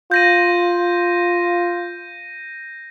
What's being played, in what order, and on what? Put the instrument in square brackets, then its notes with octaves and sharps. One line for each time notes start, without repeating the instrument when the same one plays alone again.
[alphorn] F4 [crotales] G6 A#6 D#7